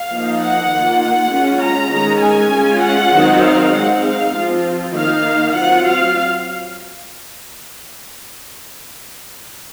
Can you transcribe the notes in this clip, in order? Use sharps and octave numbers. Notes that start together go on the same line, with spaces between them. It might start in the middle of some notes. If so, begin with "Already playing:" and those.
Already playing: F5
F3 A#3 D#4
F#5
D#3 A#3 F4
F#5
G#3 C#4 F4
A#5
D#3 G#3 C#4 A#5
G#5
G#3 C#4 F4
F#5
D#3 F#3 C4 D#4
F5
G#3 C4 D#4 F#5
F5
F3 C4 F4
D#3 A#3 D#4 F5
F#3 C4 F4 F#5
F5